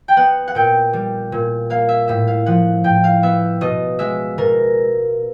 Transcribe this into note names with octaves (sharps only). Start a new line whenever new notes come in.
G5
B3 F#5
F#5
A#2 G5
G3
A#2
A#3 F5
E5
A2 E5
F5
F3 F#5
A2 G5
F5
B3 E5
B2 D#5
G#3 E5
B2 A#4